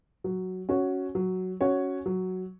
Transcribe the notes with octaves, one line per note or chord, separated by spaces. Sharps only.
F#3
C#4 F#4 C#5
F#3
C#4 F#4 C#5
F#3